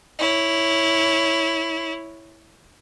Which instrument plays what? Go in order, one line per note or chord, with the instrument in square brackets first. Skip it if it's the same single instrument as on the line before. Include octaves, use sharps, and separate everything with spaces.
[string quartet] E4 C#5